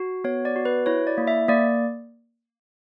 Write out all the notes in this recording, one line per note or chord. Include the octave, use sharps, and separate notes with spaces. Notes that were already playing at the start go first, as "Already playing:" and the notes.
Already playing: F#4
B3 C#5
D5
F#4
B4
E4 C#5
D5
A#3
E5
A#3 D5